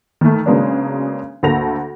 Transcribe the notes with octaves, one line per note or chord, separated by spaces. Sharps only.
D#3 A3
C#3 F#3 G#3 A#3 B3 D4
D2 A#3 A4 A#6 F7